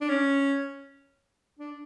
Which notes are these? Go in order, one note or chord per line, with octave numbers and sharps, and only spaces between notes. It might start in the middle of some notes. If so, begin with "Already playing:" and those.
D4
C#4
D4